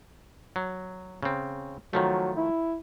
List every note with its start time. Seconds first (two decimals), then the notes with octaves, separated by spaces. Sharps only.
0.56 F#3
1.23 C#3 C4
1.93 D#3 F3 F#3 A3
2.37 E4